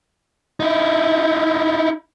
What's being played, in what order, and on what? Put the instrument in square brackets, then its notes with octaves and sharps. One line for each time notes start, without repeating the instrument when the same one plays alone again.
[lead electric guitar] D#4 E4